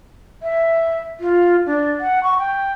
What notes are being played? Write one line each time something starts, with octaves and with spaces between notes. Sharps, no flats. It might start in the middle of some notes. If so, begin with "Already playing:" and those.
E5
F4
D4
F#5
C#6
G5